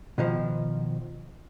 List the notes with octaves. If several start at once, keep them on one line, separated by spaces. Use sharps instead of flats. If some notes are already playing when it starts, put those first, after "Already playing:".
B2 D#3 F3